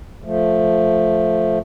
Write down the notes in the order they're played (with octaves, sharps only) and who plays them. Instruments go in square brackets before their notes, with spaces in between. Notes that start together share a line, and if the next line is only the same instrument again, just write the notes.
[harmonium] F3 A3